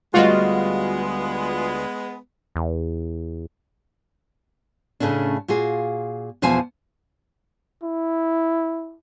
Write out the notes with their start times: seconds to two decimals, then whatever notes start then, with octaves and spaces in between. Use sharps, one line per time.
0.14 D2 G3 G#3 B3 F4 F#4 D#5
2.56 E2
5.00 A2 C#3 A3 C#4 D4
5.48 A#2 F4 F#4 G#4
6.42 E2 B2 F3 C5 G#5
7.83 E4